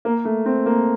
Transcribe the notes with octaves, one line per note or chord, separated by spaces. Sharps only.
A#3
A3
C4
A#3